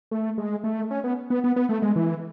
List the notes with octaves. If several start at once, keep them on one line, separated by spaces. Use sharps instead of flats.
A3
G#3
A3
C#4
B3
B3
B3
B3
A3
G#3
E3